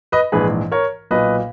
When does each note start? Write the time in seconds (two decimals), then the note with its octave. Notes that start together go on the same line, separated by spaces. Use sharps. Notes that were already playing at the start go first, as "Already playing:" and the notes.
0.12 B4 D#5
0.32 A#1 G#2 E3 G#4 B4
0.72 A#4 C#5
1.11 B1 A#2 B4 D#5